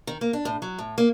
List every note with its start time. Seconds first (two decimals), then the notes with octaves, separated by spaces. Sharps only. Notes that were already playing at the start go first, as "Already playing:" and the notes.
0.07 D#3
0.21 A#3
0.33 D4
0.45 A2
0.62 F#3
0.78 A2
0.98 A#3